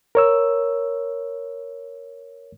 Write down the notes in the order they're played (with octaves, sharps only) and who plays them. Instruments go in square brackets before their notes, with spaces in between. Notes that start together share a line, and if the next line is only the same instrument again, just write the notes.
[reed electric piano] A#4 C#5 E6